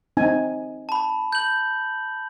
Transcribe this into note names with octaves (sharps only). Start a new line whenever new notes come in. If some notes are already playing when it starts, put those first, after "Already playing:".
C4 D#4 G#5
A5 B5
G6 F#7